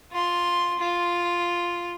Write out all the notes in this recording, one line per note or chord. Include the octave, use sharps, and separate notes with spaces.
F4 C6
F4